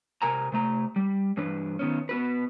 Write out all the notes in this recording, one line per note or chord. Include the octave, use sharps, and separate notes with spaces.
C3 A#4 G#5 A#5
C3 A3 A#5
G3
G2 E3 D4 B4
D#3 B3 C#4
B3 F#4 B4